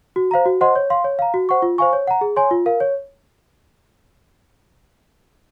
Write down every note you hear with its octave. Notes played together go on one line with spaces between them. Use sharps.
F#4
C5 F5 A#5
F#4
C5 D#5 F#5 C6
C#5
F5 C6
C#5
F5 A#5
F#4
C5 F#5 C#6
F4
C5 F5 G#5 C#6
C#5
F#5 A#5
G#4
C#5 G#5 C6
F4
A#4 F5
C#5